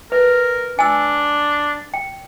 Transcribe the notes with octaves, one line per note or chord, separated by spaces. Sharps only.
A#4 B4
D4 G#5 E6
G5